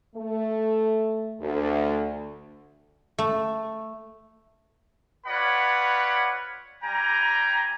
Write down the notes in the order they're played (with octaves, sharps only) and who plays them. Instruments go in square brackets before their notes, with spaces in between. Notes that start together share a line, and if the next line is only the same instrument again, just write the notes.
[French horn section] A3
D2
[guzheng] A3
[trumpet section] F4 B4 C#5 D5 F#5 B5
G3 G5 G#5 A#5